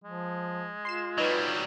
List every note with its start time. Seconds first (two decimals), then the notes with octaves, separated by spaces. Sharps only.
0.04 F3 G#3
0.85 F4 C6 C7 E7
1.18 F#3 G3 D#4 B4 G#6